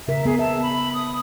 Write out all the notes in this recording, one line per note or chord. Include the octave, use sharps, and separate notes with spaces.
C#3 A#4 E5
B3 G#4
E5 A5
B5
D#6